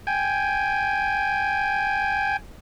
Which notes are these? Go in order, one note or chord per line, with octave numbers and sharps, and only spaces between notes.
G5 G#5